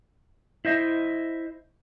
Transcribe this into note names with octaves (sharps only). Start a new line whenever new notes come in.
E4 C5 D#5 E5